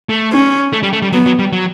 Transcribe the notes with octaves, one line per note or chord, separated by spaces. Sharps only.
A3
C#4
A3
G3
A3
G3
F#3 B3
F#3
G3
F#3